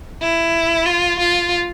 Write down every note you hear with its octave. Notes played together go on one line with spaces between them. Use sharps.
E4
F4
F4